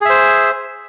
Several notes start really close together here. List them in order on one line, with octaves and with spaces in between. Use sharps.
G#4 E5 C5